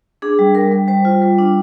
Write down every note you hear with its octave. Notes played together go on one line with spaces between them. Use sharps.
D4 G#4
G3
G3 A#4
G3
G3 C5
F4
G3
D4